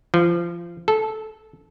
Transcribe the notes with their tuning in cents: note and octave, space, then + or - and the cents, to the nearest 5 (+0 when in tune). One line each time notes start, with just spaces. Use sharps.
F3 -25
A4 -15